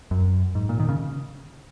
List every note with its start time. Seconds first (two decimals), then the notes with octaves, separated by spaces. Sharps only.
0.11 F#2
0.55 G#2
0.69 A#2
0.80 D#3
0.89 C#3